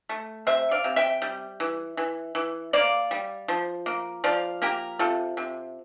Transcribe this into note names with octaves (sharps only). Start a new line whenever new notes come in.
A3
C3 C5 E5
D5 F5
C3
E5 G5
G3
E3
E3
E3
A#3 D5 F5
G3
F3
A#3
F3 D5 F5
A#3 G4 A#4
C3 F4 A4
C3